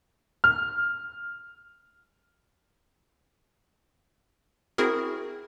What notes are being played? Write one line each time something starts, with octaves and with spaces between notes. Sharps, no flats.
F6
C4 E4 F#4 G#4 A#4